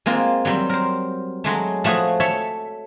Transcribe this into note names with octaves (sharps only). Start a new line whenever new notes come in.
G#3 A#3 C4 F4
F#3 G3 C4
A#4 C5
F#3 G#3 A3
F3 A3 F#4 G#4
A4 C#5 E5